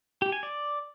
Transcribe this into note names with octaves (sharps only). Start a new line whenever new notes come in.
G4
G#5
D5